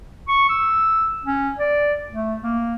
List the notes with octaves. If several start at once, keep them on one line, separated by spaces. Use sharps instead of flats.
C#6
E6
C#4
D5
A3
A#3